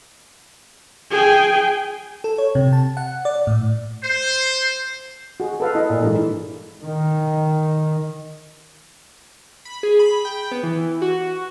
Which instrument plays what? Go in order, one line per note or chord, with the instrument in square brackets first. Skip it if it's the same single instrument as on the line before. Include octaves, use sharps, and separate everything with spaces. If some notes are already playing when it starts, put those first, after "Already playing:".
[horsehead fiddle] G#4 G5
[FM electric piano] A4
C#5
C3
A5
F#5
D5
A2
[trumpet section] C5
[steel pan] F#4 G#4
A4 B4 F5
E4 D#5
[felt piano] A#2
G#2 E3 A4
[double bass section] D#3
[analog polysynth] B5
G#4
B5
G5
B3
E3
F#4